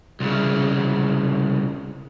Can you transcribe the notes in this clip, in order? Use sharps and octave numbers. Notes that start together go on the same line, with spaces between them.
C2 C#3